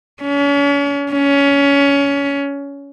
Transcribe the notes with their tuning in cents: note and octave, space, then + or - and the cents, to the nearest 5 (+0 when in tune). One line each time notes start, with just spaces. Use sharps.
C#4 +40
C#4 +20